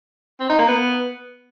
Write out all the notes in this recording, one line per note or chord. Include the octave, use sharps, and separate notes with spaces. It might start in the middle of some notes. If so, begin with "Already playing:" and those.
C4
D#4
A#3
B3